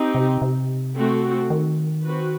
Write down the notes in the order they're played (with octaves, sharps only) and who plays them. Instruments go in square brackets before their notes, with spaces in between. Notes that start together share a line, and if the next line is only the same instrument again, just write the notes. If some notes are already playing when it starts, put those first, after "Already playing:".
Already playing: [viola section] C4 D#4 G4
[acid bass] C3
C3
[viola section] A3 C4 F#4 A4
[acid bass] D#3
[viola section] C4 F#4 B4